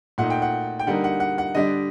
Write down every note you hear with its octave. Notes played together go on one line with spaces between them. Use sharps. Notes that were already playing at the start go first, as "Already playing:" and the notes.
A#2 A3 D#4 F#5
G5
F#5
G5
D3 G3 A#3 D#4 F#5
F#5
F#5
F#5
D3 G3 D4 D#5